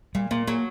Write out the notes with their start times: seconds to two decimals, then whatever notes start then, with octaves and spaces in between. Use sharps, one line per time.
0.15 A#2 G3
0.31 A#2 A#3
0.48 F#3 A#3